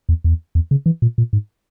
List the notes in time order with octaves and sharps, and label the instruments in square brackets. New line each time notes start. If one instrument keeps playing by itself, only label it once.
[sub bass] E2
E2
E2
C#3
E3
A#2
A#2
G#2